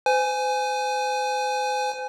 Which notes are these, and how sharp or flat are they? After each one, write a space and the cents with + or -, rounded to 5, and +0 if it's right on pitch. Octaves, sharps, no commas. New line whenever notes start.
C5 -40 G#5 +0